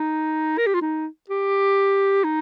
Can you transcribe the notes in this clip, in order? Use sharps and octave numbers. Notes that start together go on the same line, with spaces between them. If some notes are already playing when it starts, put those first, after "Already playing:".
Already playing: D#4
A#4
G4
F4
D#4
G4
D#4